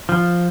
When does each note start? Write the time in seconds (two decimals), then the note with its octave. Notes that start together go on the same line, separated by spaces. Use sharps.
0.09 F3